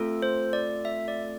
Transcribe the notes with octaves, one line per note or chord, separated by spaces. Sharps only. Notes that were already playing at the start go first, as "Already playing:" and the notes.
Already playing: A3 C4 F4 A4
C5
D5
E5
D5